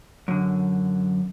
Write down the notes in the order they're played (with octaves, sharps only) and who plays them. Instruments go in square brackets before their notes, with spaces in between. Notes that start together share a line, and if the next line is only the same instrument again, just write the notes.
[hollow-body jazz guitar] F#2 D3